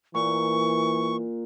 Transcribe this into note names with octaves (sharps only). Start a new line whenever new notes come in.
A#2 E3 C#6